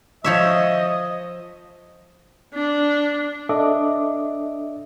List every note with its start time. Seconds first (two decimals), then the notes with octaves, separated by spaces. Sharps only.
0.24 F3 C#5 D#5 E5
2.54 D4
3.49 D4 A4 D#5 E5 D6